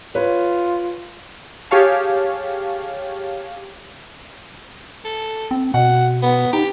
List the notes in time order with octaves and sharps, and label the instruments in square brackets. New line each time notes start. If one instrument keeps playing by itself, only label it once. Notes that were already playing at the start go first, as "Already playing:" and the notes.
[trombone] F4 [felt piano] B4 C#5
[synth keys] G4 G#4 C#5 F5 A5
[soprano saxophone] A4
[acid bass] C4
[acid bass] B2 [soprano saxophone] F#5
[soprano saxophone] B3
[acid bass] D#4 [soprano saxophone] G4